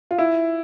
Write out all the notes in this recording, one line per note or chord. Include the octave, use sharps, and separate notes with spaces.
F4
E4